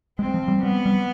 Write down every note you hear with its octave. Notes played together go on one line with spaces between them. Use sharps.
G#3 C4
F3
G3
G3 B3
G3